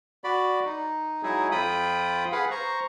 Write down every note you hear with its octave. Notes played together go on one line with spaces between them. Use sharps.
F#4 D5 B5
D#4
F#3 G#3 D#4 E4 G#4
F2 F4 G5 B5 D#6
G#4 B4 F5 F#5
C5 A#5 C#6